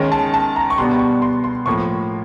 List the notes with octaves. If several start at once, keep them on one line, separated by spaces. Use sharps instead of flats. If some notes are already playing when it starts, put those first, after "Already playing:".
Already playing: D#3 G#3 C#4
A5
A5
A#5
C#6
B2 G3 B3 D4 C6
C#6
C6
C6
A2 F3 A#3 C#6